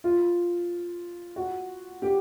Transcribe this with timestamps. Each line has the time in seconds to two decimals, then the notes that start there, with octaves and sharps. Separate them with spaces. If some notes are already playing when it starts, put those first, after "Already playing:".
0.04 F4
1.36 F#4
2.02 G4